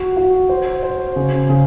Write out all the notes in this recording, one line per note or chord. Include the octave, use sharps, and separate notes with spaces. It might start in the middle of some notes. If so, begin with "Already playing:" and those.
Already playing: F#4
F#4
C5
C5
C#3
C#3